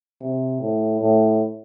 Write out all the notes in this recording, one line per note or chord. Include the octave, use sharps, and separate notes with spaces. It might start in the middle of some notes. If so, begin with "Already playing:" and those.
C3
A2
A2